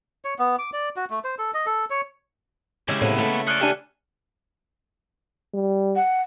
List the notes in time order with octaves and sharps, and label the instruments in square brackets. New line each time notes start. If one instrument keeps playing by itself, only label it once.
[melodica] C#5
B3
D6
D5
F#4
A3
C5
A4
D#5
A4
C#5
[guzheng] C#3 G#3 E4 [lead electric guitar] G4 C#5
[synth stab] A2 C3 [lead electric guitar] A#3 B3
[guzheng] A3
[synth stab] C#6
[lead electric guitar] G#4 D5 [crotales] F6 F#6 C#7
[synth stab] D4 G4 [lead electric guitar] A4 G#5
[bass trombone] G3
[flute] F#5